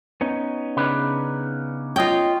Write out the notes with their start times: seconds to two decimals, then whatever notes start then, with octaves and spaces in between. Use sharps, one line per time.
0.21 B3 C#4 D#4
0.77 C#3 D4 B4
1.96 F4 C#5 D#5 G5